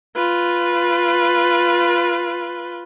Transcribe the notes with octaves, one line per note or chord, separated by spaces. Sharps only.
F4 B4